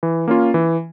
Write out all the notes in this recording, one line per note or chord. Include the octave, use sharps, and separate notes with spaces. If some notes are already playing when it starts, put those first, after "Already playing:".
E3
A#3 C#4 F4
E3